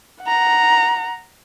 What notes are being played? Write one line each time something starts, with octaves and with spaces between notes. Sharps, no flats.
F#5 A#5